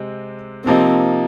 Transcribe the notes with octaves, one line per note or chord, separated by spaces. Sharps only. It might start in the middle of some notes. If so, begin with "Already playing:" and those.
Already playing: C3 G#3 C4
C3 F3 A#3 C4 D#4